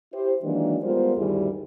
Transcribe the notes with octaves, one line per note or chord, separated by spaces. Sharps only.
E4 G4 C5
D#3 E3 F#3 G#3 A#3 D4
G3 G#3 B3 F4 A#4 C5
D2 G2 D#3 G3 E4 G#4